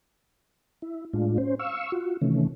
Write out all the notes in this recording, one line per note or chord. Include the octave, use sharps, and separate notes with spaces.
E4
A2 G#3 D4 F4
C#4 C5
F5 C#6 E6
F4 F#4
C3 D#3 E3 A3 C#4